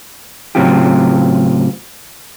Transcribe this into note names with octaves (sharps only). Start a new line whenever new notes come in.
A2 C#3 F#3 C4 F4 G4